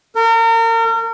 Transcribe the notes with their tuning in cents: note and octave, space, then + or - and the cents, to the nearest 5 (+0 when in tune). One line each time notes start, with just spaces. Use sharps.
A#4 -35